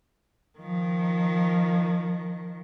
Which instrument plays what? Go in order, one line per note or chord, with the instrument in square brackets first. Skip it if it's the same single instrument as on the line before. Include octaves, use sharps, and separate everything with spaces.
[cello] D#3 F3